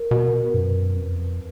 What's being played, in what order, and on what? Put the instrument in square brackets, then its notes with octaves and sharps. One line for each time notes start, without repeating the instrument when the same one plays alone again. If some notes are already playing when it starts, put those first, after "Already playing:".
Already playing: [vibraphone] A#4
[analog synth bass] B2
[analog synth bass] F#2 [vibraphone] B4
[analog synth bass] F2